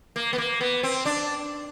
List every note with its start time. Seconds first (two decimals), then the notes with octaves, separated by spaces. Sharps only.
0.16 A#3
0.33 B3
0.38 A#3
0.61 B3
0.83 C4
1.06 D4